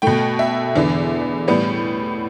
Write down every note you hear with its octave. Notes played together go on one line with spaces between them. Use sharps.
B2 A3 G5
E5
E2 D3 B3
A2 G3 B3